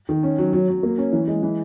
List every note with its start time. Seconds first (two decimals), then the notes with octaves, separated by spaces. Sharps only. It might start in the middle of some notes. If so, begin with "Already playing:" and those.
0.09 D#3
0.23 C#4
0.38 F#3
0.53 F#3
0.68 F#3
0.83 A#3
0.98 C#4
1.13 E3
1.28 G#3
1.43 E3